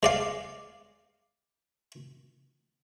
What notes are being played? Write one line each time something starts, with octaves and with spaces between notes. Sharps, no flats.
G#3 D5 F5